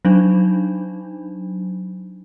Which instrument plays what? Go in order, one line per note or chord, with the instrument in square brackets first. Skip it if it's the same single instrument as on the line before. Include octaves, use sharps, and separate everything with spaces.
[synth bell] F#3 D4 D#4